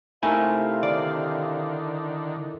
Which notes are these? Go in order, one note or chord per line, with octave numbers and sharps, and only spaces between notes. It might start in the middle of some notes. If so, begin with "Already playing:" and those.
C3 A3 D#4 E4 A4 A#4 F5 G#5
D3 D#3 D5